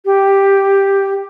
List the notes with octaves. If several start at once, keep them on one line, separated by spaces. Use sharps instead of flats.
G4